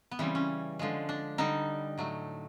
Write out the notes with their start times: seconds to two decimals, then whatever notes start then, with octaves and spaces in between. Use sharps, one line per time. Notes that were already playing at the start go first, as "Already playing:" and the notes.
0.11 B3
0.19 C#3 E3 G3 C4
0.35 C#4
0.79 D3 F3 G#3
1.09 D4
1.38 D3 G3 D#4
1.98 A2 F#3 A3